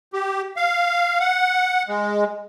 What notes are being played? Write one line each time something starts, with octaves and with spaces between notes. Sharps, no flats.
G4
F5
F#5
G#3